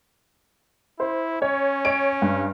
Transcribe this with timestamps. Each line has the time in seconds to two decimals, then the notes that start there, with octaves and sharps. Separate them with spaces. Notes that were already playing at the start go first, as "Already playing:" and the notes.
1.00 E4 C5
1.42 C#4 C#5
1.85 C#5 D7
2.22 G2